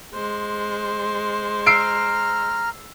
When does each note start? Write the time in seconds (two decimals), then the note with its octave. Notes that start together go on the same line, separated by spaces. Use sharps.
0.14 G#3 C5
1.66 A#5 E6 F6 C7 D7